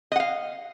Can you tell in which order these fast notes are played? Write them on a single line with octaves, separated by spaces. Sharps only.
D#5 F#5 F5